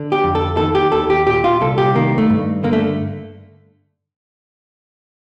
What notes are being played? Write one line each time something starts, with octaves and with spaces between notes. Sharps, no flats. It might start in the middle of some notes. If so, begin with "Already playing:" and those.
Already playing: D3
G4
F2
A4
D#3 A4
G4
D#2 A4
G4
A#2 G4
F4
C2 A4
G4
D#3 A#3
A3
G2
D3 A#3
A3